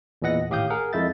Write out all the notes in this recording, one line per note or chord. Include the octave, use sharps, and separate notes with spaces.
E2 A#2 E3 D#5 F#5 A#6
G#1 A2 G4 F5 D#6 G6
G#4 A#4 F#5
F2 G#3 E4 E5 G6 A6